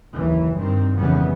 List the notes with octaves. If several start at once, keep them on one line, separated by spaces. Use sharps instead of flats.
F#1 D#2 E3
G2 D#3 C4
G#1 F2 C#3 E3 G3 B3